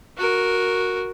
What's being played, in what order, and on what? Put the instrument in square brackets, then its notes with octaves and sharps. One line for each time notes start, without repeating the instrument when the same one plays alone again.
[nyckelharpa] F#4 A#4